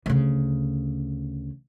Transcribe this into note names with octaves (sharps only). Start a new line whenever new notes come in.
D2 C#3